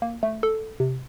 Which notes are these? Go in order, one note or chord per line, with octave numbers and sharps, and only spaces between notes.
A#3
A3
A4
C3